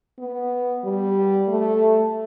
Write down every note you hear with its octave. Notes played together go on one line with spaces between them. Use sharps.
B3
G3
A3